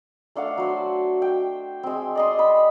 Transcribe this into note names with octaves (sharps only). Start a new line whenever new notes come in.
A3 D4 F5 F#5
F#3 C5
G5
G#3 C4
D5 D#5 C6
B5